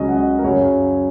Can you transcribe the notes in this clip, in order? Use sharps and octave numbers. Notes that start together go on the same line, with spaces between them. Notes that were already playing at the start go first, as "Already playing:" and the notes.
Already playing: C#2 C#3 F#3 C#4 D#5
F#5
D#5
A#4
F#2 C#3 F#3 C#5